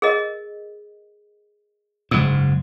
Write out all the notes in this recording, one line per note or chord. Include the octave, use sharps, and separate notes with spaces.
G#4 A#4 D#5
F#1 G#2 E6